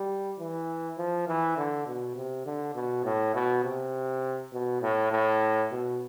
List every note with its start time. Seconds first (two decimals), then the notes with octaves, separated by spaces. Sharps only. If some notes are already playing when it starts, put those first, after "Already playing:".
Already playing: G3
0.39 E3
0.98 F3
1.28 E3
1.57 D3
1.87 B2
2.16 C3
2.46 D3
2.75 B2
3.04 A2
3.34 B2
3.64 C3
4.53 B2
4.82 A2
5.12 A2
5.71 B2